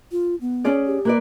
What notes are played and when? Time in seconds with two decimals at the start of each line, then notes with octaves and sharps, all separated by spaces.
0.12 F4
0.41 B3
0.64 C#4 G#4 D5
0.86 G4
1.05 A#3 B4 D5